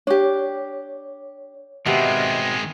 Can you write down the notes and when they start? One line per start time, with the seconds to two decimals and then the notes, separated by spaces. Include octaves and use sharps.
0.07 D4 G4 C#5
1.86 B2 D#3 G#3 B3 C4 G4 E5